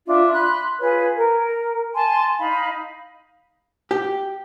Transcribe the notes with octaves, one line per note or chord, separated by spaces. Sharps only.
D4 F4 E5
B5 C6 F#6
F4 G#4 B4 C#5
A#4
G#5 A5 C6
D#4 F5 B5
G4